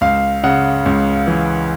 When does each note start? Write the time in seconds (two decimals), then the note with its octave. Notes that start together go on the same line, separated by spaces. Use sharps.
0.01 C#2 F5
0.44 C#3 F#5
0.86 C#2
1.27 E3